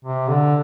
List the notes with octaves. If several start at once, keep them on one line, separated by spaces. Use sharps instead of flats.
C3
D3